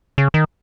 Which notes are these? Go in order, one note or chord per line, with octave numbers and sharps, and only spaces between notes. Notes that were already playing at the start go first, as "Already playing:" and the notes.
C#3
D#3